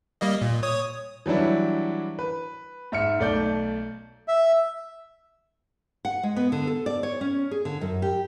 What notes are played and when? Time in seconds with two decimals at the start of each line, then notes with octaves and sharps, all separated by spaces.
0.21 G3 A#3 D#5
0.42 A#2
0.63 C#5 D#6
1.26 E3 F#3 G3 D4 E4
2.19 B4
2.92 G#2 E5 F6 C#7
3.20 B1 A3 D5 G6
4.28 E5
6.05 F#5
6.23 G#3
6.36 B3
6.52 D3
6.67 A4
6.86 D5
7.03 C#5
7.21 C#4
7.51 G#4
7.65 D3
7.81 F#2
8.02 G4